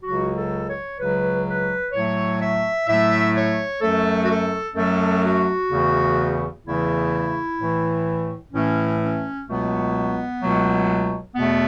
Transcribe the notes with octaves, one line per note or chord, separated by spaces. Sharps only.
C#2 C#3 F#3 F#4
A4
C#5
C#2 C#3 F#3 B4
B4
A2 F#3 A3 C#5
E5
A2 F#3 A3 E5
C#5
F#2 F#3 A3 A4
F#4
A4
F#2 F#3 A3 A4
F#4
E2 C#3 E3 A3
E2 C#3 E3 A3 E4
A2 E3 A3
A2 E3 A3 C#4
C#4
C#2 B2 F#3 A3 B3
C#2 B2 F#3 A3
E2 B2 A3 B3